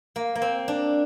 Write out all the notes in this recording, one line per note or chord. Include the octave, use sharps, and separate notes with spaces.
A#3
A#3
C4
D4